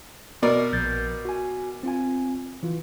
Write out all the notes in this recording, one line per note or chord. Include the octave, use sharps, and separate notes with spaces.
B2 A#4 D5
A#1 G6 A6
F#4 G#5
C4 F4 G#5
E3 F4